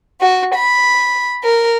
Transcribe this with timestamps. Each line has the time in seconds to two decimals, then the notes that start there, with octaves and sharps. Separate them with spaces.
0.20 F#4
0.54 B5
1.43 A#4